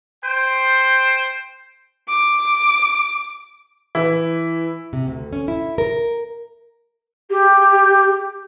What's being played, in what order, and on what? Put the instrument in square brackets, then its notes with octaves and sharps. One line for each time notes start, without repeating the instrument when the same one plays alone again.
[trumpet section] C5 G5 C6
[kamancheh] D6
[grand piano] E3 E4
[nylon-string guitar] C3
D2
C#4
E4
A#4
[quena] G4